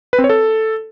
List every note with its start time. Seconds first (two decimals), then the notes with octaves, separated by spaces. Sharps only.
0.13 B4
0.18 C4
0.24 C#5
0.30 A4